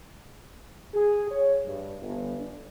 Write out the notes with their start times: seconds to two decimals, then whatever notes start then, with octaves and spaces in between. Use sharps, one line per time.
0.94 G#4
1.29 C#5
1.66 G2
2.01 G1
2.40 D4